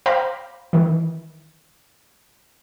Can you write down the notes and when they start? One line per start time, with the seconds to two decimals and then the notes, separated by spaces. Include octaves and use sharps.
0.06 C5 F5 G5 A#5 B5 D6
0.73 D#3 E3